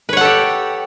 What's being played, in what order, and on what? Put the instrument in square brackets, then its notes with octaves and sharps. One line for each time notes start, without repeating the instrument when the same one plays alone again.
[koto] B4
C#5
F#5
A4
G4